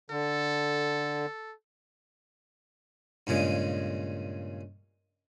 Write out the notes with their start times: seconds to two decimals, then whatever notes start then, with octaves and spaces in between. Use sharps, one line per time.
0.10 D3 A4
3.27 G2 A#2 C#3 G#3